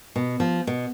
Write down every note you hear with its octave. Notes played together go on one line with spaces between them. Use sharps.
B2
F3
B2